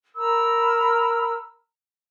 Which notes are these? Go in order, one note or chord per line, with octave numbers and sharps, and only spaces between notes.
A#4 A#5 B5 E6